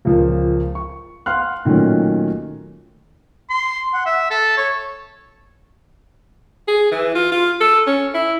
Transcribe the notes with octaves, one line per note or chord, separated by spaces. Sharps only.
C#2 A#2 F3 A#3
C#6
F5 F#5 C6 F6 F#6
A#2 D#3 F#3 A3 C#4
C6
F#5
E5
A4
C#5
G#4
E3
F4
F4
A4
C#4
E4